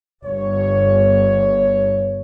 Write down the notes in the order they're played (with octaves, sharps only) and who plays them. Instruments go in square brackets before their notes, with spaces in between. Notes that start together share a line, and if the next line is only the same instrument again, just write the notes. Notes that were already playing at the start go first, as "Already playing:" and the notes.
[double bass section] G1 [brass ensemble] C#5